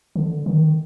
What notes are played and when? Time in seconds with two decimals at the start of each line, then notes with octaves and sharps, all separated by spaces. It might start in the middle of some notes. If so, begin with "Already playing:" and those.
0.16 D3
0.46 D#3